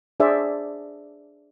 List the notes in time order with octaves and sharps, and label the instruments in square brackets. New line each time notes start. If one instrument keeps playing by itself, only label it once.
[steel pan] D4 G#4 C5 D5 E5